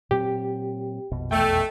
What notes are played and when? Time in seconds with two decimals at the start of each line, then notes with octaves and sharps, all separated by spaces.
0.11 A#2 F#3 C4 G4
1.11 A#1 F2 B2
1.31 E2 A3 G5